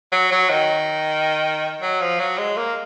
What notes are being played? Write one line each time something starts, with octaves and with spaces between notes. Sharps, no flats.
F#3
F#3
D#3
F#3
F3
F#3
G#3
A#3